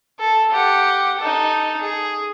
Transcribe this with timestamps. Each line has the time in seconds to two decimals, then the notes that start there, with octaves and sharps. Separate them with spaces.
0.20 A4
0.51 G4 F#5
1.19 D#4 A4
1.80 G#4